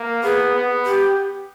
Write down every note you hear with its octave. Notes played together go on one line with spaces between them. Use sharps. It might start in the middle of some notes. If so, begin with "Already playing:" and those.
Already playing: A#3
B3 G#4
B3
G4